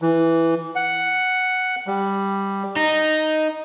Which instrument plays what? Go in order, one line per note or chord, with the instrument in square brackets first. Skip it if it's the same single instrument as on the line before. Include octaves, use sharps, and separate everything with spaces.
[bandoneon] E3
F#5
G3
[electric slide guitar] D#4